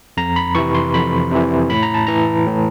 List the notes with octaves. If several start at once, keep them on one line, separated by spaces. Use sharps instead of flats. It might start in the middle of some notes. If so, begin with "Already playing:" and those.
F2 A#5
B5
C3 E3 C#6
C6
F2 B5
C3 E3
A2 B5
A#5
A5
E3 A#5
A2